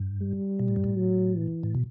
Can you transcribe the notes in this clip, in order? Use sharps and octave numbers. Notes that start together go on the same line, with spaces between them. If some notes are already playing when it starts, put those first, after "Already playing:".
Already playing: G2
G3
B2
A2
G2
A2
F#3
E3
A2
B2